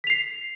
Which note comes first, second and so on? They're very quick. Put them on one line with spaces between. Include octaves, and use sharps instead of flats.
B6 F7 C7